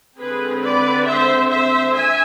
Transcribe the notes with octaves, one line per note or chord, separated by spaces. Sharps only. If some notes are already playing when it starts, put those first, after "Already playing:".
D3 G#3 C4 G#4 B4
B4 D5
C5 E5
C5 E5
D4 E5 G#5